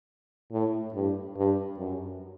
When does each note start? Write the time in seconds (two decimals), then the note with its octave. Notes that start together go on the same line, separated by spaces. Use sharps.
0.52 A2
0.94 G2
1.36 G2
1.78 F#2